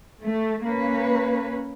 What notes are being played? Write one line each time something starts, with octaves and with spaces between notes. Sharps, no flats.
A3
A#3 C#4 B4